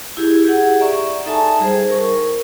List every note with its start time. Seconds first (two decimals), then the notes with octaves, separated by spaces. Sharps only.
0.17 E4 G4 G#4
0.45 G4 G#4 F#5
0.80 D5 E5 A#5 C#6
1.26 D#4 A4 E5 G#5 A5
1.60 G3 G#4 C5
1.88 A#4 C#6